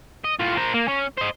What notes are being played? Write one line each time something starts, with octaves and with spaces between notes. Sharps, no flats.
D#5
A2 F4
A#4 C5
A#3
C#4
C5 D#5